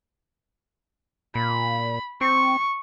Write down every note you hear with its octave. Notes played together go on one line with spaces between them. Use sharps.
A#2 B5
C4 C#6